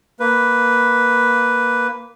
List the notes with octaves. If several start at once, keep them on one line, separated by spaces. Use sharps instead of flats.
A#3 B4